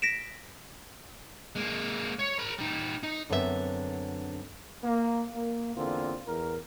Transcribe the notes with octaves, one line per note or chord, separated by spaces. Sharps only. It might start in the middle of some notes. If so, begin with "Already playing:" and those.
A#6 B6 D7 E7
G#3 A#3
C#5
A#4 B5
G3 D#4
D#4
F#2 D3 B3 C4 F#4 E5
A#3
A#3
E2 D3 A#3 C4 F4
E2 A#4